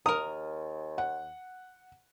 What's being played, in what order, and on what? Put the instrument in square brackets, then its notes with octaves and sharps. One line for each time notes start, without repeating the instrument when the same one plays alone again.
[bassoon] D#2 [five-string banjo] A#4 A#5 [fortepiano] D#6
[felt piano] F#5